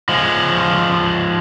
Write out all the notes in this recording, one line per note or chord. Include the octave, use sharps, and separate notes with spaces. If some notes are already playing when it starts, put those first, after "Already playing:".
F3 G#3